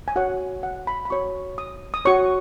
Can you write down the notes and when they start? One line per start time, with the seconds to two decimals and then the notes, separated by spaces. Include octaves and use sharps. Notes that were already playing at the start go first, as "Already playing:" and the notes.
0.08 G#5
0.16 F#4 C#5 F#5
0.63 F#5
0.87 B5
1.05 B5
1.10 F#4 C#5 C#6
1.58 D#6
1.94 D#6
2.05 F#4 C#5 C#6